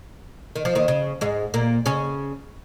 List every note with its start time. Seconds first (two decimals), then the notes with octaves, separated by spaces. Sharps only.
0.56 D#3
0.65 F3
0.75 D#2 D#3
0.88 C#3
1.21 G#2 G#3
1.54 A#2 A#3
1.86 C#3 C#4